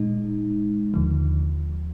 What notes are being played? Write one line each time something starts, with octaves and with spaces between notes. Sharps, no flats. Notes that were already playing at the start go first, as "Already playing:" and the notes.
Already playing: A#2 G#3 D#4
D#2 D3 F3